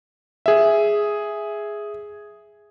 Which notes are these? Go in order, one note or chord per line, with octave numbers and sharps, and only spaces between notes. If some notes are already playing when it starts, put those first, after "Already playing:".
G#4 E5